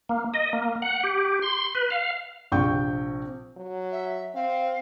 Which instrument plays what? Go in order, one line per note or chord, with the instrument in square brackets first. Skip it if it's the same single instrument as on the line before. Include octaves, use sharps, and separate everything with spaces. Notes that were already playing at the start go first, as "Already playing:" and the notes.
[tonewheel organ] A#3
D#5
A#3
F#5
G4
C6
B4
F5
[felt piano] A#1 C3 G5 C#6 G6
[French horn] F#3
[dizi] E5
[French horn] C4 [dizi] F5